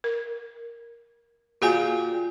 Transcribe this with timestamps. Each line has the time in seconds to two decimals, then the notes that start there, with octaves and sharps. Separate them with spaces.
0.04 A#4
1.62 A#2 F#4 G#4 G5 G#5 D6